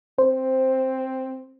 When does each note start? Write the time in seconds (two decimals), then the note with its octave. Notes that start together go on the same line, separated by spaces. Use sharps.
0.18 C4 C5